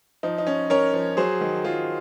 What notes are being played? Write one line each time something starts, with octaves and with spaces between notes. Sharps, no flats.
F3 D#4
D#4
C#4
C#4 A#4 C#5
F3
F#3 G#4 C5
D#3
F#3 F4 G#4